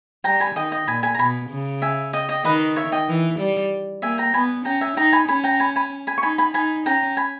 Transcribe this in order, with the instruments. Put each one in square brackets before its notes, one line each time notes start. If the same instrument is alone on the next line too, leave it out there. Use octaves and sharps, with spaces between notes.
[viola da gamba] G3 [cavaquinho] G5 A#5
[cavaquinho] G#5 B5
[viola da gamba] D#3 [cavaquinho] D#5 G5
[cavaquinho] D#5 G5
[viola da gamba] A#2 [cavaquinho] G#5 B5
[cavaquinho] G#5 B5
A#5
[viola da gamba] B2 [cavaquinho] G#5 B5
[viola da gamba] C#3
[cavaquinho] E5 G#5
D#5 G5
D#5 G5
[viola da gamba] D#3 [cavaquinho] B4 D#5
[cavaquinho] C#5 E5
D#5 G5
[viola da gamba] E3
G3
[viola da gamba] A#3 [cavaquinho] E5 G#5
[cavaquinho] G5 A#5
[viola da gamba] B3 [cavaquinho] G#5 B5
[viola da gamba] C#4 [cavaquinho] G5 A#5
[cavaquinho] E5 G#5
[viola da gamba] D#4 [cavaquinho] G5 A#5
[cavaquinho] G#5 B5
[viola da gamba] C#4 [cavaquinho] G#5 B5
[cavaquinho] G5 A#5
G#5 B5
G#5 B5
G#5 B5
C#6
[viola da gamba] D#4 [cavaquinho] G#5 B5
[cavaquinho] G#5 B5
[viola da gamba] D#4 [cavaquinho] G#5 B5
[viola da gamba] C#4 [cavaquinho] G5 A#5
[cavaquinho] G#5 B5